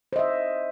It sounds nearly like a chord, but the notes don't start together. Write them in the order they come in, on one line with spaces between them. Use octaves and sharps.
C5 D#5 E5